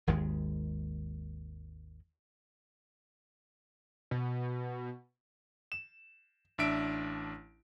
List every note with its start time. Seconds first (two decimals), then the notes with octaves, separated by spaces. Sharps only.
0.07 G#1 D#2 D#3 G#3
4.11 B2
5.72 E7
6.58 A1 D4 E5 D7